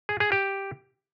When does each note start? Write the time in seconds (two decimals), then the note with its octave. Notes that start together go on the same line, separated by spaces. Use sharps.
0.09 G#4
0.20 G#4
0.32 G4